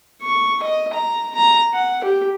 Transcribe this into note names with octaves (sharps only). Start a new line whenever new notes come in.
C#6
D#5
A#5
A#5
F#5
G4